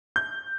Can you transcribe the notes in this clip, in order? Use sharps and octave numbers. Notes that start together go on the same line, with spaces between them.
G6